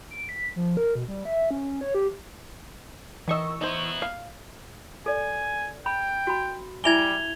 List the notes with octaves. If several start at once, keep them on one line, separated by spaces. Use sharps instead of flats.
D7
B6
F3
A#4
B2
G3
E5
C#4
C#5
G4
D#3 E3 D#5 C#6 E6
B3 D#4 E4 C5
F5
A4 D5 G#5
G5 B5
F#4 B5
G3 E4 E5 G#5 G#6 F7 G7